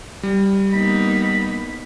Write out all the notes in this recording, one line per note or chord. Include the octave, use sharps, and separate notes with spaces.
G3
A#3 B3 D#4 B5